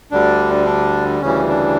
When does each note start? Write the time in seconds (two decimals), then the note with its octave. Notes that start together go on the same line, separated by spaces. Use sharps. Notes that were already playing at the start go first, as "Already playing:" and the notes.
0.11 D2 D3 G3 D4
0.66 D4
1.22 D2 C#3 E3 G3 C#4
1.49 D4